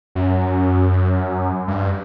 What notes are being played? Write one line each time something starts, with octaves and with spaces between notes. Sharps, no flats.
F#2
G2